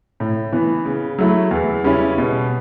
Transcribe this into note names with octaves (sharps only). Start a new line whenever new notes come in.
A2
E3 B3
C#3
F#3 A3 E4
E2
C#3 G3 C#4 E4
B2